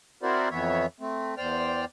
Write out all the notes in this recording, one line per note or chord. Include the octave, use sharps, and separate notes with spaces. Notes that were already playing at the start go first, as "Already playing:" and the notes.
C4 E4 F#4 A#4 C5 D5
F2 E3 B3 C#5 E5
A3 C4
E2 C5 D5 G5 F6